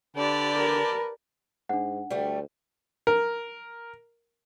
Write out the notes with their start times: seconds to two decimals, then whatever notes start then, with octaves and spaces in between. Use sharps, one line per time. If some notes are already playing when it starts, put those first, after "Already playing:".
0.16 D3 G4 B4 D5 A5
0.56 A#4
1.69 G#2 D4 F#5
2.10 D2 G3 A3
3.07 A#4